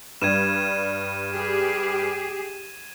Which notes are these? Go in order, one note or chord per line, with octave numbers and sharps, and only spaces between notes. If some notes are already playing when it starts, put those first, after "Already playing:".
G2 G3 G#6 D#7 E7
G4 G#4